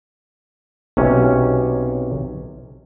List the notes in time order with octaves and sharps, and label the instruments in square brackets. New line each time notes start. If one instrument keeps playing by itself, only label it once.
[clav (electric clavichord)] B1 C3 C#4